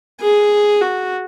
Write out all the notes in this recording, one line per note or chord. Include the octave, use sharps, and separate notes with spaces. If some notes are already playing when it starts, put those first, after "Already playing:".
G#4
F#4